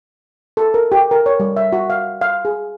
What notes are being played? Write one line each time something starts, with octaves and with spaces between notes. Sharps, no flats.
A4
A#4
G4
A#4
C#5
G3
E5
F#4
F5
F5
G#4